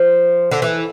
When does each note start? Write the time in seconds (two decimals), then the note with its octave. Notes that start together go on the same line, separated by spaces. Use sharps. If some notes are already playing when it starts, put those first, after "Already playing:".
Already playing: F3
0.51 D3
0.62 E3